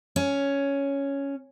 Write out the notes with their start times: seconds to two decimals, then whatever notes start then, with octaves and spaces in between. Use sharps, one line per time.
0.16 C#4